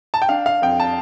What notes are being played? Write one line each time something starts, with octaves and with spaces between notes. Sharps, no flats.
A5
G5
D4 F5
F5
F2 G5
A5